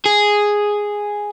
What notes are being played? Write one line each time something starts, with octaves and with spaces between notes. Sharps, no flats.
G#4